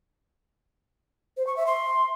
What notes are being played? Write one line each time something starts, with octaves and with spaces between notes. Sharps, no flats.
C5
C#6
E5
C6